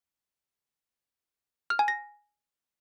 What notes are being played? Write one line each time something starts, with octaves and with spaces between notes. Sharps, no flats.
F6
G#5
A#6